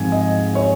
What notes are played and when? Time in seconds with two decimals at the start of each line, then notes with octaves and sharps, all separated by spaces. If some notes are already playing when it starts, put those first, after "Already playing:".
Already playing: G#2 F3 C4 G#5
0.12 D#5
0.55 C#5